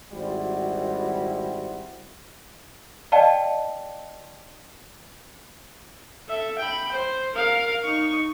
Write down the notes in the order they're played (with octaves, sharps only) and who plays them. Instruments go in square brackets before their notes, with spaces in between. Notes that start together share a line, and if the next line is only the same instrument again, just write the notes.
[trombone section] G#1 G3 E4 F#4 C5
[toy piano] D5 D#5 F5 G5 A5
[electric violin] A4 E5
G5 B5
C5
A#4 F5
D#4 C#6